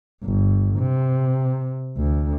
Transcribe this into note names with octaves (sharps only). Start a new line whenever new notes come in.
G1
C3
D2